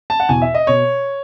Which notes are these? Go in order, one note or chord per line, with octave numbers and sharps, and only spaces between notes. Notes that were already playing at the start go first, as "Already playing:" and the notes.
A5
F#5
E2 B2 G#5
E5
D#5
B2 C#5